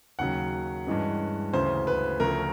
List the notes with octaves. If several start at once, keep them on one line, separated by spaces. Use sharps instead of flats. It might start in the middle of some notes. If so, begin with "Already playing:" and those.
D#2 C#3 F#3 F#5
G2 E3 G#3 C#4
D2 C#3 E3 C5
B4
D2 C#3 F3 A3 A#4